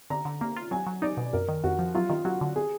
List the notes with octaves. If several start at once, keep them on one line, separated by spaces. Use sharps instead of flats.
D3 A#5
D3
A#3 A#5
F4
F#3 G#5
F#3
D#4 D5
B2
F#2 A#4
D#3
F2 F#4
F3
F#3 F4
D#3 F4
F#3 F#4
D3
G#4